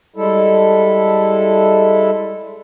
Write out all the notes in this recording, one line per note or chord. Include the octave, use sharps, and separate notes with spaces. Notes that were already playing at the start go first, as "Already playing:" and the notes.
G3 G#3 E4 A4